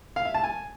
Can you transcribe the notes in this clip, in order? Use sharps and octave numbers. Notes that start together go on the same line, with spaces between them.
F5
E5
A5
G#5